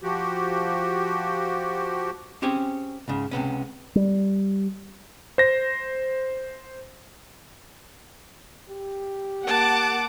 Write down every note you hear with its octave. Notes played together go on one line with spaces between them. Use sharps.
F3 F#4 G4
C4 C#4 G4 G#4 C5 G#5
C#2 G#2 C#3
C#2 C3 B3 C#4
G3
C5 A#6
G4
A#3 F#5 A5 D6